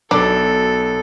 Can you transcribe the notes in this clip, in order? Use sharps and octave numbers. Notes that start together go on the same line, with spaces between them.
B1 B2 D4 G4 A4